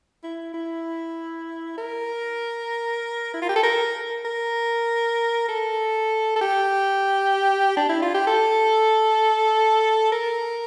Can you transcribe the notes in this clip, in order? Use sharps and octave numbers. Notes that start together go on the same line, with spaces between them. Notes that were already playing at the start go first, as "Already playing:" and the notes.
E4
E4
A#4
E4
F4
G4
A4
A#4
A#4
A4
A4
G4
D4
E4
F4
G4
A4
A#4